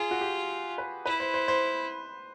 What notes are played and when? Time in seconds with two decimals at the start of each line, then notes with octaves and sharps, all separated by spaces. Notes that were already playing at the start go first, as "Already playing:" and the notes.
Already playing: F4 G#4
0.11 F#4
0.21 G4
0.78 B4
1.06 E4 B4
1.20 C5
1.34 C5
1.48 C5